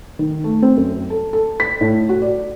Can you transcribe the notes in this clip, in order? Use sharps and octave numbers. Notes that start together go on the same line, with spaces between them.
D#3
A3
C4
F#2
A4
A4
B6
A2
F#4
D5